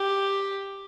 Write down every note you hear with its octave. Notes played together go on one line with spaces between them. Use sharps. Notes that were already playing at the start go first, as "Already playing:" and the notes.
Already playing: G4